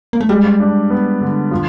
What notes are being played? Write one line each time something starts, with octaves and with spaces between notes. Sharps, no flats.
A#3
A3
G3 G#3
D4
B3
D3
F3